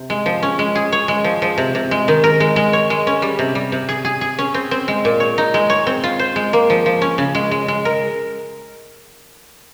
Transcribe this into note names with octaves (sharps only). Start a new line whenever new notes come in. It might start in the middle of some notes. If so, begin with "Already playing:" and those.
Already playing: C3
G#3
F3
C#4
G#3
G#4
C#5
G#3
F3
F3
C3
C3
G#3
D#3
A#4
G#3
G#3
C#5
G#3
C#4
G3
C3
G3
C3
G#4
G#4
G#4
C#4
C4
C4
G#3
A#2
C#5
D#4
G#3
C#5
C4
F4
C5
G#3
A#3
F3
F3
C#4
C#3
G#3
G#3
G#3
A#4